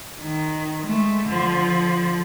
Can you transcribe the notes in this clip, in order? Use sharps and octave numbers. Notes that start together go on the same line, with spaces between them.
D#3
G#3 A3
D3 F3